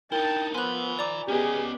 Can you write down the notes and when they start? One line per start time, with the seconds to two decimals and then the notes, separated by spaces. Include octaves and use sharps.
0.12 D#4 E4 A#4 G5 A5
0.54 F3 B3 G#5 B5 C6 F#6
0.99 D5 A#5 D6
1.28 B3 C#4 G4 G#4 D#5